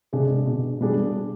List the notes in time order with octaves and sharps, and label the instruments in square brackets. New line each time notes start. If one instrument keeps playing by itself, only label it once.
[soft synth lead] C3 [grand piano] G#3 D4 G#4
[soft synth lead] B2 [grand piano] D3
[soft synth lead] B2 [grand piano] G3 D4 G#4